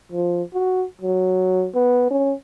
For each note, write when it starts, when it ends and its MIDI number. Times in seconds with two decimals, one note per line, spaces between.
0.12 0.42 53
0.53 0.84 66
1.01 1.67 54
1.75 2.10 59
2.10 2.33 61